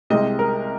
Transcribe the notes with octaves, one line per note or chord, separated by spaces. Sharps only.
C2 C3 G#3 D#5
A#4